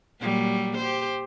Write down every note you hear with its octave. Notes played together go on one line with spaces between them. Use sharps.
A#2 F#3 G3
G4 C5